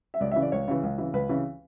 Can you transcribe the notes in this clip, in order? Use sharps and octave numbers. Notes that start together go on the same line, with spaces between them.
E5
C#2 D5
E5
C#3 E3
D5
C#2 C#5
C#3 E3
C#2
C#3 E3
C#2 B4
C#3 E3